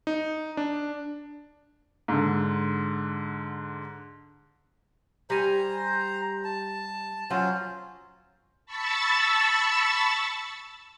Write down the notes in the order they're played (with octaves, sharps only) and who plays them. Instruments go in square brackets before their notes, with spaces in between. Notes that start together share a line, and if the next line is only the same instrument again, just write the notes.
[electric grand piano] D#4
D4
[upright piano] G#2 D3
[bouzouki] G3 G#5 [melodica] C5 A#5
[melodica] A5
[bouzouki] F#3 [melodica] C#4 F4 C5
[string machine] A5 B5 C#6 E6 A6